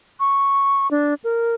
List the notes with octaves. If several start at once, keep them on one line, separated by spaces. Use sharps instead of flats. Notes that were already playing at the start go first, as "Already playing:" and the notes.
C#6
D4
A#4